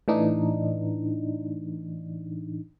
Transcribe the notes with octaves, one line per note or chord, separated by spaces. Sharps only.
A2 E3 D4 D#4